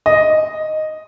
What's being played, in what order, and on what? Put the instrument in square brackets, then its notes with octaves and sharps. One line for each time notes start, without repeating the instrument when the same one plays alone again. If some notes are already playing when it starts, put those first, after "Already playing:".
[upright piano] D#5